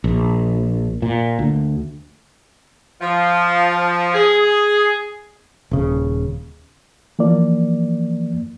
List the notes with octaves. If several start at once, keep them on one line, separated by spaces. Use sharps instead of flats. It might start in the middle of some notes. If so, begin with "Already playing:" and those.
A#1
A#2
D2
F3
G#4
D#1 C#3
E3 F3 A#3 D5